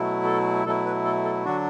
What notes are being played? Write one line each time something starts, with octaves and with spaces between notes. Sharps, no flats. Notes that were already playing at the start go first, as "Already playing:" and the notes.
Already playing: B2 F#3 A3 E4
A4
B2 F#3 A3 E4 A4
B4
A4
A4
D3 F#3 D4 F#4